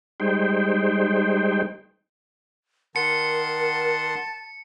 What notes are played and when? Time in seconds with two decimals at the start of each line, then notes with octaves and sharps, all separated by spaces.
0.20 G3 G#3 D#4 C5 G5
2.96 D#3 A#4 F#5 A5 C6 C#7